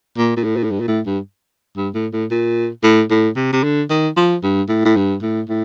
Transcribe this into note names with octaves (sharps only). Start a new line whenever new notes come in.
A#2
A#2
A2
A#2
A2
G2
A#2
A2
G2
G2
A2
A2
A#2
A2
A2
C3
C3
D3
D#3
F3
G2
A2
A2
G2
A2
A2